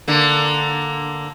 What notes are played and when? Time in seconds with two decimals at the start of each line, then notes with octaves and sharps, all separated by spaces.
0.08 D3 A#3